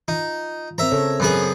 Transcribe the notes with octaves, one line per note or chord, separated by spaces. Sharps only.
D#4 F4
C4 A#4 C5 E5 A#5
C#3 A4 C#5
F#2 B3 G#4